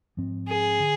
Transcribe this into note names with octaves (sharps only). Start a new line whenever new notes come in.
G#2 F3 C4
G#4
D3